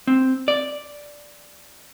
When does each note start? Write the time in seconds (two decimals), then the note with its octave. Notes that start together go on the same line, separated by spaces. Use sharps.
0.07 C4
0.48 D5